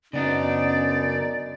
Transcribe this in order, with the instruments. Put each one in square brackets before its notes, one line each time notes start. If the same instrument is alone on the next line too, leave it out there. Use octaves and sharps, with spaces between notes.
[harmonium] F#2 D#4 [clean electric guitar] C#3 B3 D4 [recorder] D5